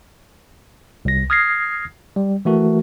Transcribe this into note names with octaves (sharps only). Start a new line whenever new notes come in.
C2 A#6
D#6 F6 G#6 A#6 C7
G3
E3 A3 F#4 A#4